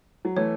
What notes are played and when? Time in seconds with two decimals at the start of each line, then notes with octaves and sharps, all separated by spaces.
0.25 F#3
0.36 E3 A3 C#5